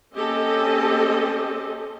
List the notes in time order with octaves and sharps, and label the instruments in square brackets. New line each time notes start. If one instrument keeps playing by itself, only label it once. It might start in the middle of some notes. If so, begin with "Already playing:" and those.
[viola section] A#3 C4 C#4 G4 A4 D#5